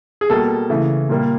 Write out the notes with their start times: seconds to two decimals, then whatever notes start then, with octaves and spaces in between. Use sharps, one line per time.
0.21 G#4
0.29 B2 G3 A#3 A4
0.70 C#3 E3 A3
1.09 A#2 G3 A#3